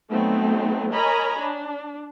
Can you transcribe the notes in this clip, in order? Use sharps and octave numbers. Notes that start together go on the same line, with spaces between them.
F#3 A3 B3 C4 D#4
A#4 C#5 D#5 G#5 A#5 B5
D4